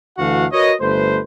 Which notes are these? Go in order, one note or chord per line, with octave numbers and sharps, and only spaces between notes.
D2 E3 A3 F#4 F5 F#5
F#4 A#4 B4 C#5 D#5
G1 A3 B4 C5